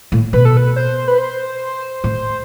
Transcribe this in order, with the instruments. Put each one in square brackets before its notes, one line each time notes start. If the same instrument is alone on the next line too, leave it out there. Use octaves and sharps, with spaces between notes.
[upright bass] A2
[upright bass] B2 [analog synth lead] B4
[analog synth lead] A4
B4
C5
B4
C5
[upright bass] A2